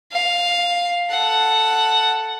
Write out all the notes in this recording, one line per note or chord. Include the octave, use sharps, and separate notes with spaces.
F5
A4 F#5